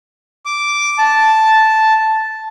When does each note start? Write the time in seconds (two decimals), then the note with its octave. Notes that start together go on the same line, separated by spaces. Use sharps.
0.46 D6
0.98 A5